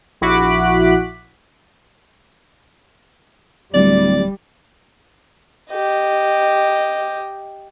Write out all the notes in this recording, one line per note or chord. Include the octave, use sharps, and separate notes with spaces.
A#1 E4 F#4 D6 F#6 B6
D1 G3 D5
G4 D#5